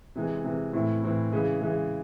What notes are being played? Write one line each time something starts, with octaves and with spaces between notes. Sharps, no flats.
C3 E3 G#3
C3 E3 G#3
A2 E3 C4 E4
A2 E3 C4 E4
C#3 E3 G#3
C#3 E3 G#3